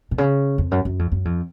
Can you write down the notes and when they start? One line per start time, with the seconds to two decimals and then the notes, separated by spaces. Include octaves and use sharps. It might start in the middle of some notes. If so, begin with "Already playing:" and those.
0.11 B2
0.18 C#3
0.58 F2
0.71 F#2
0.85 F#2
0.99 F2
1.12 F#2
1.25 F2